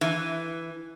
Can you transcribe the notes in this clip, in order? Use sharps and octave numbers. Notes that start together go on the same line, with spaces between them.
E3